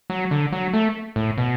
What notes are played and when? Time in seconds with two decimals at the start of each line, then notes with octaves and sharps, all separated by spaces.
0.10 F#3
0.31 D3
0.52 F#3
0.73 A3
1.16 A2
1.38 B2